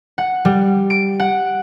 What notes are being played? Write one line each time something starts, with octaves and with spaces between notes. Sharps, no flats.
F#5
G3
D7
F#5